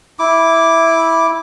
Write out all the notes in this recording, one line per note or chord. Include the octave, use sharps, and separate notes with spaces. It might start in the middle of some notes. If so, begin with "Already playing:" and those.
E4 D6